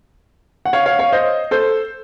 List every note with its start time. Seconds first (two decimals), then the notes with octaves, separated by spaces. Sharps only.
0.65 F#5
0.73 C#5 F5
0.86 C#5 F5
0.99 C#5 F5
1.12 C5 D#5
1.51 A4 C5